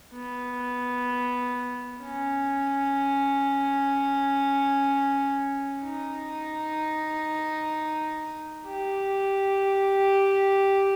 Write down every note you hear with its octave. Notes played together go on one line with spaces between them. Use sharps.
B3
C#4
D#4
G4